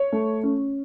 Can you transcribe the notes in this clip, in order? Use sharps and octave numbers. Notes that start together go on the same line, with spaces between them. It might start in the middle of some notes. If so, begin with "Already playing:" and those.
Already playing: C#5
A3
C#4